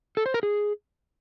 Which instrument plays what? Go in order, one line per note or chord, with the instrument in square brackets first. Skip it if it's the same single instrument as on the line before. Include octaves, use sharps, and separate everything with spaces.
[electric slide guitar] A4
C5
A#4
G#4